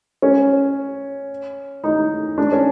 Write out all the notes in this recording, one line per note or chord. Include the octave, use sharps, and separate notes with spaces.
C#4
D#4
D4
C#4